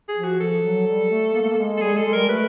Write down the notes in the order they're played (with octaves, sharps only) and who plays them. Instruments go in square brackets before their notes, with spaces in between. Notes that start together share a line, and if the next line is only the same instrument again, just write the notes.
[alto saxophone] G#4
[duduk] F3
[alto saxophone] F#4
[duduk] F3 [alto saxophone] A4
[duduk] F#3
G3
A3
A#3
A3
A#3
G#3
[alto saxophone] A4
[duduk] G3 [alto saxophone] G#4
[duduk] G#3
[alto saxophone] A4
[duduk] G#3
[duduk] G3 [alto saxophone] A#4
[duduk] A3 [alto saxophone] B4